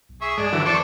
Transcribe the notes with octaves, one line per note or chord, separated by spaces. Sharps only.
B1
G#4 E5 C#6
G2 G#3 D4
D3 E3 F#3
E2 D4 A4 C5 C#6 D6